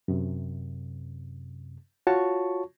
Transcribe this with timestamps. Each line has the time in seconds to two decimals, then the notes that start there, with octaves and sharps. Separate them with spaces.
0.08 F#2 C3
2.07 F4 F#4 C#5 A5 C#6